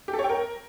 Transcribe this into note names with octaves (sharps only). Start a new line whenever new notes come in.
G4
A4
C#5
G5
A#4